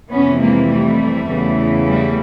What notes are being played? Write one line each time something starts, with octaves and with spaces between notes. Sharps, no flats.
F2 C3 E3 B3 C#4
G#3 A#3
G3 A3
E2 C#3 E3
G3 A3